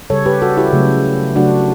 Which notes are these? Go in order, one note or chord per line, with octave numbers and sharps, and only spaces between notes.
C#3 G3 A4 C#5
G4 B4
F#4 A4
E4 G4
C#3 F#3 A3
C#3 F#3 A3 D4 F#4